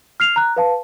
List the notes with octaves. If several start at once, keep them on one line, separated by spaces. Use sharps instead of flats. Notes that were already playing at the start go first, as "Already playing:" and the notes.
F6 C7 F7
A#5 F#6
B4 F5 A5